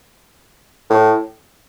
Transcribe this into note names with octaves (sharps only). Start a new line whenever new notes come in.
A2